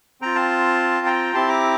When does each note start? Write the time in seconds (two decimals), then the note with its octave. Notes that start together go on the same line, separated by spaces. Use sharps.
0.21 C4 F4 G5 A#5
0.35 F5 A5
1.06 G5 A#5
1.34 C4 E4 G4 A5 C6
1.49 A#5 D6